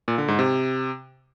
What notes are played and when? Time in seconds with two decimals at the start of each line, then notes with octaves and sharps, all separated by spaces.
0.08 A#2
0.18 D3
0.28 G#2
0.39 C3